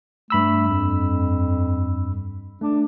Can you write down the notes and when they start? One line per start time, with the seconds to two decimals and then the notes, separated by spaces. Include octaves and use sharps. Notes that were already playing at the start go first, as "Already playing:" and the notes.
0.30 G2 A3 B5 E6
0.69 F2
2.61 A3 D4